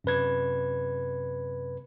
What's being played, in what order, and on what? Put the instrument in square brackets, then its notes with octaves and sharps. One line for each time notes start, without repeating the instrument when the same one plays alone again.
[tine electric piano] F#2 C3 B4 G#6